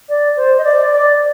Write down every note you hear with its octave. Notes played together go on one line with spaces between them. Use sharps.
D5
C5
D#5
D5
D5